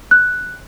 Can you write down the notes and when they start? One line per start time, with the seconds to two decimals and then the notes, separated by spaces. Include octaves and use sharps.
0.11 F#6